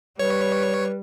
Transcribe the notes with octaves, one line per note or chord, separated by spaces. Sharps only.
G3 B4 C#5